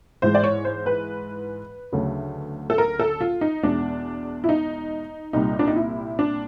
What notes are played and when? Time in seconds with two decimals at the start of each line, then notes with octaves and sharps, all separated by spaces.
0.22 G#2 E3 G#3 C5
0.35 D5
0.44 C#5
0.65 C5
0.86 B4
1.92 D2 C#3 F#3 A3
2.70 A4
2.78 A#4
2.99 A4
3.21 F4
3.41 D#4
3.63 E2 B2 G#3 D4
4.44 E4
4.49 D#4
5.33 C2 A#2 G3 D#4
5.59 D4
5.68 D#4
5.76 E4
6.19 D4